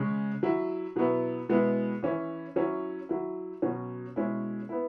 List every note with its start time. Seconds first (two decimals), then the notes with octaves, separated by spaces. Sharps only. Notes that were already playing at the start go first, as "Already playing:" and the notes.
Already playing: C#3 G#3 C#4
0.43 F#3 E4
0.96 B2 F#3 B3 E4
1.49 B2 G#3 B3 E4
2.03 E3 C#4 E4
2.56 F#3 C#4 E4
3.09 F#3 E4
3.62 B2 F#3 C#4
4.16 B2 G#3 C#4 E4
4.69 B3 E4